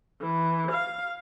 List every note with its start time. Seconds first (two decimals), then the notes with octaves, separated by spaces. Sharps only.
0.21 E3
0.71 F5